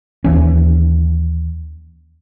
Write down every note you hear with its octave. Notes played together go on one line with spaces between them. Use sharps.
D#2 E3 C#4